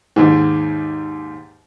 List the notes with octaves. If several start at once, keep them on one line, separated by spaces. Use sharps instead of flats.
D#2 G#2